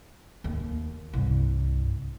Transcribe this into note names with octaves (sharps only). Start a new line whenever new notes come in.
D#2
C2 G2